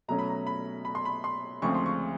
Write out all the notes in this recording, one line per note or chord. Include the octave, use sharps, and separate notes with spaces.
B2 F#3 A3 C#4 A#5
B5
A#5
B5
B5
C6
B5
C6
D2 C#3 F3 G#3 C4 C#6
C6
C#6